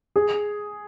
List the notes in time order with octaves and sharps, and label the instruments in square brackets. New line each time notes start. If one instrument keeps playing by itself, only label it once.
[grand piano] G#4